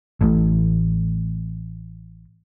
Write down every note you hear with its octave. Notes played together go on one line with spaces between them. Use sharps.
A1 A2